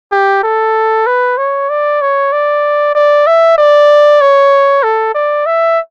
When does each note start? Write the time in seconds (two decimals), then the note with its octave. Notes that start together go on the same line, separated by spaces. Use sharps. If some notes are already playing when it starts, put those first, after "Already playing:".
0.12 G4
0.44 A4
1.07 B4
1.38 C#5
1.70 D5
2.01 C#5
2.33 D5
2.95 D5
3.27 E5
3.58 D5
4.21 C#5
4.83 A4
5.15 D5
5.46 E5